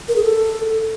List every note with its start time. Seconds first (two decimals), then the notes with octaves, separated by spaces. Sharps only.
0.08 A#4
0.16 G#4
0.23 A4